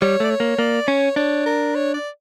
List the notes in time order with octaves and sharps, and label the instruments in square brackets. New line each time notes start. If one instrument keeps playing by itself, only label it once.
[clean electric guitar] G3 [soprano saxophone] C#5
[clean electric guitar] A3 [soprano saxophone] D5
[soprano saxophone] C#5
[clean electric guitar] A#3
[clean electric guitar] A#3 [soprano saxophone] D5
[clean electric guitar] C#4 [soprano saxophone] C#5
[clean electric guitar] D4 [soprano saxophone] C#5
[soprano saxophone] A#4
C#5
D5